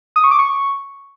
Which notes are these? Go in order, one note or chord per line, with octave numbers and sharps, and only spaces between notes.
D#6
C#6
D6
C#6